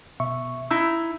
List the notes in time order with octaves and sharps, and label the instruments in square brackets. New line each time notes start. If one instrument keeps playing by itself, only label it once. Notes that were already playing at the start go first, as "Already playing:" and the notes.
[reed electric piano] B2 E5 C#6
[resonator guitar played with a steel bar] D#4 E4 [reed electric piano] E6